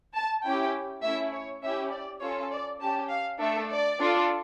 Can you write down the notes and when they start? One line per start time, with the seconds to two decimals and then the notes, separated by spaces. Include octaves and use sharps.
0.15 A5
0.44 C#4 E4 G4 G5
1.03 A3 C#4 E4 E5
1.33 C#5
1.63 C#4 E4 G4 E5
1.92 D5
2.22 C#4 F4 A4 C#5
2.51 D5
2.80 C#4 G4 A5
3.10 F5
3.40 A3 D4 A4 E5
3.70 D5
4.00 D4 F4 A4